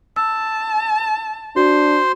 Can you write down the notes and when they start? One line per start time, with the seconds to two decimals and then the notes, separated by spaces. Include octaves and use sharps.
0.16 A5 E6
1.56 D4 F#4 C5 C6